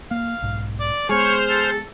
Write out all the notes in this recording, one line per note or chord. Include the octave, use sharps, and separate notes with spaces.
A#3 F5
B1 G#2
D5
G#3 B3 G#4 C5 C#5 F6
A4